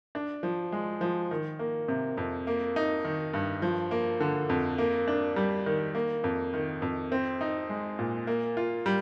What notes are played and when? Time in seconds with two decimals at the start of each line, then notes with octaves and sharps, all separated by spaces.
0.15 D4
0.43 F3
0.72 G#3
1.01 F3
1.31 D#3
1.59 A#3
1.88 C3
2.17 F2
2.47 A#3
2.76 D#4
3.05 D#3
3.33 G2
3.62 F3
3.91 A#3
4.20 D3
4.49 F2
4.78 A#3
5.08 D4
5.36 G3
5.66 D#3
5.95 A#3
6.24 F2
6.54 D#3
6.82 F2
7.12 C4
7.41 D#4
7.69 G#3
7.99 A#2
8.27 A#3
8.57 F4
8.86 G3